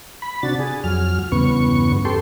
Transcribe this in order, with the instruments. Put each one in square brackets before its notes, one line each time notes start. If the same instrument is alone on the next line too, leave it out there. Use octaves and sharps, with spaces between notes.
[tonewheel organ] B5
C3 D4 F#4 A6
G#4
F2 F#3 F6
E2 G2 C#3 B3 C#6
G4 A4 C6